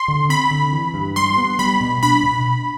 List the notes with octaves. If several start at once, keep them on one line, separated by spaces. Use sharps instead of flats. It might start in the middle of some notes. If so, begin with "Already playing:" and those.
Already playing: C6
D3
C4 B5
D3
E3
G2
G3 C6
B3
G3 B5
B2
D4 B5
B2